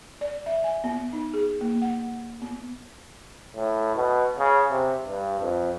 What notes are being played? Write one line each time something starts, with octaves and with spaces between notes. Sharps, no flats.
D5
E5
G#5
B3
D#4
G#4
A#3
F#5
B3
A2
B2
C#3
C3
G2
F2